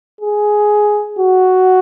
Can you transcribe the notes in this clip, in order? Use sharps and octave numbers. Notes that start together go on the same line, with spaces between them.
G#4
F#4